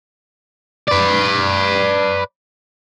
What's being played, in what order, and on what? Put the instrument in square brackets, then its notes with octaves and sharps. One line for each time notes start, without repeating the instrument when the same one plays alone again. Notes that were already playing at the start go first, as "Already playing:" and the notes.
[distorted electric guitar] B4 D5